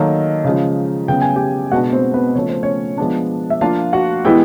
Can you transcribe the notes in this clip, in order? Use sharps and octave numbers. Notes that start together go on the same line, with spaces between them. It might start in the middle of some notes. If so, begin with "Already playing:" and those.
Already playing: D#3 F#3 A#3 A4
C#3 F3 G#3
C#3 F#3 B3 G5
G#5
G4 G5
B2 G#3 B3 D4 F#4 F#5
C4 C5
B3 B4
C#3 F3 A3 C#5
C5
C#4 C#5
F3 G#3 B3 D4
E5
F3 A#3 D4 F4 F5
F#4 F#5
E3 G#3 B3 E4 G4 G5